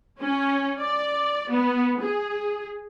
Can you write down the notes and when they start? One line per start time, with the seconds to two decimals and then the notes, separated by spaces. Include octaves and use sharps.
0.19 C#4
0.78 D5
1.49 B3
2.01 G#4